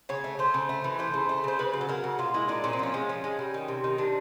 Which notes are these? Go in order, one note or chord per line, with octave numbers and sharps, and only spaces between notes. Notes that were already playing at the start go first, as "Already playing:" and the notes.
C#3 C#5
A3
A3 C5
C#3
A3
E3
A3 C5
C#3
A3
C#3 C5
C#3 B4
F#3
A4
F#3 A#4
C#3
A#2 F4
G#3 E4
A#2 D4
A#2 C#4
C4
F3 C#4
G#3
F3
G#3
G3
D#3
C3
D#3
C3 D4